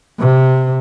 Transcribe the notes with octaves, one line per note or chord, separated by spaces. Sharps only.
C3